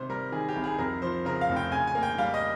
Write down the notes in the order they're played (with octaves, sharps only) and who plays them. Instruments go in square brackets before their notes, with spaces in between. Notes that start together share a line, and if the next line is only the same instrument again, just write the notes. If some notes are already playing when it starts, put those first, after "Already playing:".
Already playing: [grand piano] G#1 C3 C5
G3 A#4
D#3 G#4
G4
C2
G#4
F2 A#4
F3 C5
C#3 A#4
F5
F1
G5
C#3 G#5
G#5
A#3
G5
G3 F5
D#5